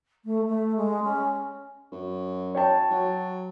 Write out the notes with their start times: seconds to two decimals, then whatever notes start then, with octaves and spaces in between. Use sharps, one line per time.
0.25 A3
0.47 A3
0.77 G#3
1.03 C#4
1.92 F#2
2.55 C#5 G5 A5
2.91 F#3